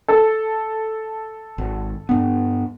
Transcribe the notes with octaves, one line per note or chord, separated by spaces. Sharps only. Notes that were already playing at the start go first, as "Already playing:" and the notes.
A4
G#1
G2 B3